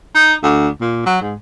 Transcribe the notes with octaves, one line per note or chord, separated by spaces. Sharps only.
D#4
D2
A#2
F#3
G#2